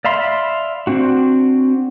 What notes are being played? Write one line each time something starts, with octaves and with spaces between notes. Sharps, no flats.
D5 E5 F5 B5 C6
C4 D4 F#4